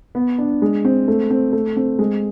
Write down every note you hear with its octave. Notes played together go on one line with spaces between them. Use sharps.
B3
D4
G#3
C4
A3
C4
A3
C4
G#3